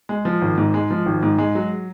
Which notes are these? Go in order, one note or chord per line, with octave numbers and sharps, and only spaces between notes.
G#3
F3
G#1
G#2
G#3
F3
G#1
G#2
G#3
F#3